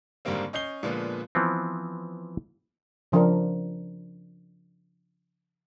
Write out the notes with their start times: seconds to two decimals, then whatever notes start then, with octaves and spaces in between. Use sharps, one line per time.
0.25 G#2 D3 D#3 G3 A#3 C4
0.53 C#4 D#5 G6 C7 G7
0.83 A#2 D3 F3 G#3 B3
1.35 E3 F3 B3 C4
3.12 C#3 F3 D4 A#4